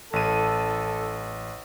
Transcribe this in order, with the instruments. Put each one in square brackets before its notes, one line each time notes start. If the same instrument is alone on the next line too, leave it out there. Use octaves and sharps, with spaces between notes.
[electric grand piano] A1 D#7 [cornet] A4